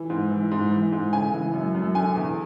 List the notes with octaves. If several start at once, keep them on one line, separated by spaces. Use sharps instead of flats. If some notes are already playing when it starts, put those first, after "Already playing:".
Already playing: E3
G#2
E3
G#2
E3
G#2
C#3 G#5
E3
F#2
F#2
D3 G#5
E2